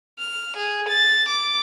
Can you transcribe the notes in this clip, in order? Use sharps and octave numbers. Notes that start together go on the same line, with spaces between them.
F6
G#4
A6
D6